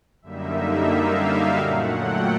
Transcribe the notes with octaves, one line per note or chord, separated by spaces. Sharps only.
F#2 D3 G3 A#3 D#4 E5
F5
F5
A#2 F#3 A3 F#5
G5